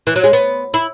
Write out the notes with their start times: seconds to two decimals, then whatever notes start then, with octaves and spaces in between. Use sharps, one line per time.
0.07 E3
0.16 F#3
0.24 G#3
0.33 B3
0.74 E4